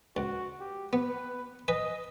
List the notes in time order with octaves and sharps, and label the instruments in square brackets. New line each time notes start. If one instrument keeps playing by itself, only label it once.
[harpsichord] C#2 [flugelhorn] F#4
[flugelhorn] G4
[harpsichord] B3 [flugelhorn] B4
[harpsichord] B4 G#5 [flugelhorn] D#5